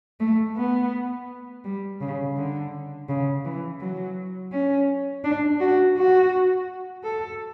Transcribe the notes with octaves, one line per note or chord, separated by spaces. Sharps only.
A3
B3
G3
C#3
D3
C#3
E3
F#3
C#4
D4
F#4
F#4
A4